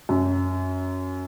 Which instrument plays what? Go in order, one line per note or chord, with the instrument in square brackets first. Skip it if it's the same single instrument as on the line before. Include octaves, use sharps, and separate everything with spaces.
[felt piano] F#2